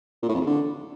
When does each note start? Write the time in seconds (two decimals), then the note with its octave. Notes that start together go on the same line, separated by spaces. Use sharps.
0.23 A#2
0.29 A2
0.35 F2
0.41 E2
0.47 D3